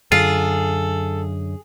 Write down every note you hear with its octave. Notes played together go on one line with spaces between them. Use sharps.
F#2 D3 F4 G#4 A4